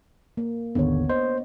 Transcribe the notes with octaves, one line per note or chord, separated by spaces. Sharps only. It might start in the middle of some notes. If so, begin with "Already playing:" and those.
A#3
G#1 D#2 D3 B3 D4 C#5
C5 D#5